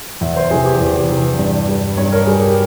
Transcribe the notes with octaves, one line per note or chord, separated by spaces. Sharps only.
E2 E5
C5
C3 E3 G#4
G4
E2 G4
C3 E3
G2
G3
G2 C#5
A#4
G3 G#4
G4